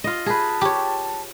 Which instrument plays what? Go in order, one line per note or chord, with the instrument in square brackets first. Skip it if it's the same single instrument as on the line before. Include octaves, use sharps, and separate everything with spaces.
[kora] F4 D#5
[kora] G#4 B4 [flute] A5
[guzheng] G4 C#5